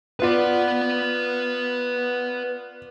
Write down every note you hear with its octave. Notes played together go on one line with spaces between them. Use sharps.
B3 F4 B4 D5 F#5